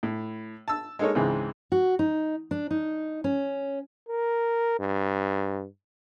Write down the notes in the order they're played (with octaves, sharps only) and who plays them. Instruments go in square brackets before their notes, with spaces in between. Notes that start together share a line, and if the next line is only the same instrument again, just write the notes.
[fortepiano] A2
A5 E6
G#3 A#3 D#4 A4 A#4 C#5
C#2 G#2 C#3 E3 G#3 C4
[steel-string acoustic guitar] F#4
D#4
D4
D#4
C#4
[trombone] A#4
G2